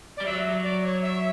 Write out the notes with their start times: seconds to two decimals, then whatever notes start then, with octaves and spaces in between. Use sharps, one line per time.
0.17 D5
0.21 G3
0.26 F#3 E5
0.64 D5
0.83 C#5
1.02 E5